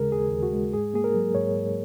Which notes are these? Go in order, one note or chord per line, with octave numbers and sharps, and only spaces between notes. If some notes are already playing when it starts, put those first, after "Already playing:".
Already playing: D#2 C#3 G#3 G#4 A#4
D#2 G#4
D#2
F#4
G#3
G#2 G#4
A#3 G#4
A#4
F#3
G#2 C#5
G#2